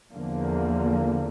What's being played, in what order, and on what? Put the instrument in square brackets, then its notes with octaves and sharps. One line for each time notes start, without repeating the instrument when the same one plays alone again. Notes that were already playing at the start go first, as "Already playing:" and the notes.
[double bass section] E2 D3 F3 A#3